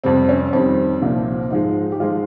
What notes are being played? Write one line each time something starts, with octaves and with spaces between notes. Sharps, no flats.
F2 C3 G3 C4
C#4
F2 D#3 G3 C4
C2 A#2 F3
G#2 F3 G#3 D#4
G4
G#2 F3 G#3 F4